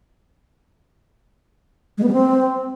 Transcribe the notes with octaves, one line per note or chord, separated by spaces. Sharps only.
G#3
B3
G3
C4